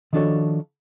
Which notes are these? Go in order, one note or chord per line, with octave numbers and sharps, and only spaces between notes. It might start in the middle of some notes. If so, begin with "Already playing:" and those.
D#3 F3 D4 F#4 A4 C#5